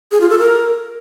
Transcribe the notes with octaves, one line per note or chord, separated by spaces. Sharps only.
G#4
F4
A4
A#4